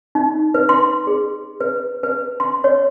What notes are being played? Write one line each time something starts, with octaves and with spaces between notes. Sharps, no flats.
D#4
B4
C6
G#4
B4
B4
C6
C#5